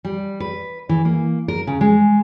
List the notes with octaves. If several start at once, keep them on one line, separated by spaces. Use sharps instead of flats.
G3
B4
E3
A#3
A#4
C#3
G#3